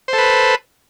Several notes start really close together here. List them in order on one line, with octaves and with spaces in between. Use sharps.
C5 A4 B4